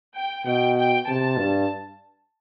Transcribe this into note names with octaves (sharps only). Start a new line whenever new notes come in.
G5
B2 G5
G5
C3 A5
G2